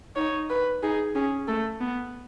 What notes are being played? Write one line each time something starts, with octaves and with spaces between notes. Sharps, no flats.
D#4 C#5
B4
D#4 G#4
C#4 G#4
A3 A4
B3